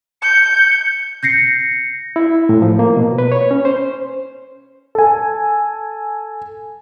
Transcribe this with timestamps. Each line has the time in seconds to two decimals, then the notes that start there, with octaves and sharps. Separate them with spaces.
0.22 G6 C#7
1.23 G6 A#6 C7 C#7
2.16 E4
2.49 A2
2.62 F3
2.79 A#3
2.96 B2
3.18 B4
3.32 C#5
3.51 C#4
3.65 C5
4.95 A4 G#5